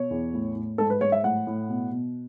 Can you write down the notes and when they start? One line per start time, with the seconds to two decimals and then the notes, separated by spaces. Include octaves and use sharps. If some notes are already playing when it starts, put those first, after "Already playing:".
Already playing: B2 C#5
0.10 E2
0.34 A2
0.56 A2
0.78 G#2 A4
0.90 B4
1.01 G#2 C#5
1.12 E5
1.23 A2 F#5
1.47 A2
1.69 B2
1.92 B2